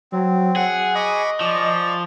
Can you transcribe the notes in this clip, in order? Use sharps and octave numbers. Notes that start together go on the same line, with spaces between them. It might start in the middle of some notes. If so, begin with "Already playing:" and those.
F#3 C4
G#4 F#5
D#5 B5 C#6 D6
F3 D5 C#6